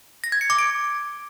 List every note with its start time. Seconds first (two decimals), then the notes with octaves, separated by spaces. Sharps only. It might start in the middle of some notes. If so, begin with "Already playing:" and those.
0.24 A#6
0.32 G#6
0.41 C#7
0.50 D6
0.59 D7